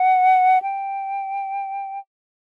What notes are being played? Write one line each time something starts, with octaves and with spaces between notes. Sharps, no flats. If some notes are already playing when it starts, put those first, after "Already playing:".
Already playing: F#5
G5